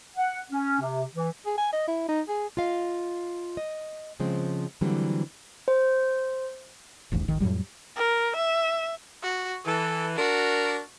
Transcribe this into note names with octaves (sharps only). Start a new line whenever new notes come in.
F#5
C#4
C3
E3
G#4
G#5
D#5
E4
D#4
G#4
F4 D#5 F5
D#5
C#3 F3 G#3 C4
D3 E3 F#3 G3 A3 C4
C5
E1 A1 D#2 G#2
D1 G#1 D#3
F2 A2 F#3 G3
A#4
E5
F#4
E3 A4
D4 F#4 A#4